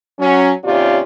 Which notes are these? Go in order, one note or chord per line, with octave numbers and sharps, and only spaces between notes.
F#3 C#4
D#2 C3 C#4 F4 G4 D5